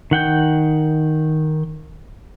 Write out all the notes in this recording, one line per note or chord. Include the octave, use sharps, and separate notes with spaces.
D#3 F#5 G5 G6